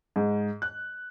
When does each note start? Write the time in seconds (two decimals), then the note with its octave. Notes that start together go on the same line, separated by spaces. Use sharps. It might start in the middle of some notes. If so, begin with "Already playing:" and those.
0.16 G#2
0.62 F#6